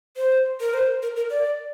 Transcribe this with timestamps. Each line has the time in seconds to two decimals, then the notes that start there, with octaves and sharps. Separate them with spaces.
0.17 C5
0.61 A#4
0.74 C5
1.02 A#4
1.16 A#4
1.30 D5